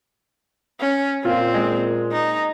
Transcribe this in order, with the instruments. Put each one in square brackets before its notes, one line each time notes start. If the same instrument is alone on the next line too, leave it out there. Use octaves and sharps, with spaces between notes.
[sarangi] C#4
[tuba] A#2 [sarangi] C4 [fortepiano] F4
[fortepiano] G#3
[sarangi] D#4